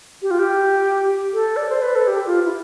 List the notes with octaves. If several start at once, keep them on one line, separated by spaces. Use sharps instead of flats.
G4
F4
G4
A4
D5
C5
B4
A4
G4
F4
E4